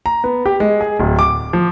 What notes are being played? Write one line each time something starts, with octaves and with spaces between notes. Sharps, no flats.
A#5
B3
G4
G#3
G#4
D1
D6
F3